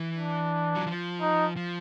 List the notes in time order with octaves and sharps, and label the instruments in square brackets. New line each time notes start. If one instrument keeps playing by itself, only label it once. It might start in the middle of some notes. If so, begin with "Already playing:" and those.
Already playing: [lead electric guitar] E3
[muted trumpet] D4
[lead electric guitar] F#3
F3
[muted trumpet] D#4
[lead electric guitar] F3